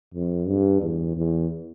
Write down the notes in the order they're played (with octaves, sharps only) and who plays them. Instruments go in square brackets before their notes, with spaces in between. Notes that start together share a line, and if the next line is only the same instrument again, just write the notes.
[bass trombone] F2
G2
E2
E2